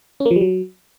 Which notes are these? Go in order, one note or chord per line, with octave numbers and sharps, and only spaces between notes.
C#4
A#3
F3
G3
F#3